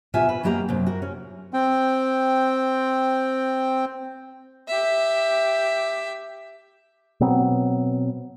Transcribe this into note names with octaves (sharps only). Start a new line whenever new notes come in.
D2 B2 F4 G4 E5 G#5
B4
F#2 F#3 A#3 G4 D#5 A#5
F#2 C3
F#4 A#4
C#4
C4 G5
G4 E5
B2 F#3 B3 C4